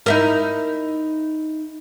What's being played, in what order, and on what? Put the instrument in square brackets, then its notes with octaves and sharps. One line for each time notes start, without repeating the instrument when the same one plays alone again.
[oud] D#4 E4 A#4